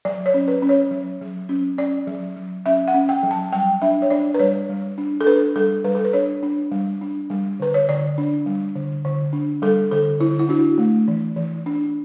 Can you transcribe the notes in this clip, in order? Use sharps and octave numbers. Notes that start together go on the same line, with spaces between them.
F#3 D5
C#5
C#4
B4
C#4
C#5
F#3
F#3
C#4
C#4 D5
F#3
F#3
C#4 E5
F#5
C#4
G5
F#3
A5
G3 G5
D4 E5
C#5
D4 D5
B4
G3 C#5
G3
D4
A4
D4 B4
G3 A4
G3 B4
A4
B4
D4 C#5
D4
G3
D4
G3
D3 B4
C#5
D3 D5
D4
G3
D3
D3
D4
G3 A4
D3 A4
D3 E4
E4
D4 F#4
A3
E3
E3
D4